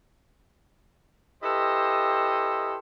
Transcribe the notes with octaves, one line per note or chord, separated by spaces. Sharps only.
E4 G4 A4 B4 C5 D#5